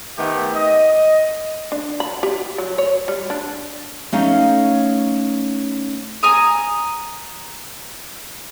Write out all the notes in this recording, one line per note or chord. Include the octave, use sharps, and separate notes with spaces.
D#3 A3 B3 C4 G4
D#5
D4
B5
G4
F#3
C#5
G3
D4
A3 C#4 D#4 A4 C#5 F5
G#5 A#5 D#6